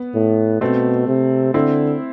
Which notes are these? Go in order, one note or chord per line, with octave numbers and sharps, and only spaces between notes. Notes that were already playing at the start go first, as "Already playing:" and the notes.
Already playing: B3
A2
B2 A3 C4
C3
D3 C4 E4